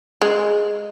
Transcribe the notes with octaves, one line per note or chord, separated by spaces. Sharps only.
G#3